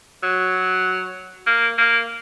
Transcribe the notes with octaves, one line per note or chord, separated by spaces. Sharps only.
F#3
A#3
A#3